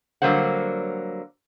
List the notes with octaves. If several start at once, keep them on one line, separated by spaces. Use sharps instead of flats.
D3 F#3 G3 A#3 C5 F#5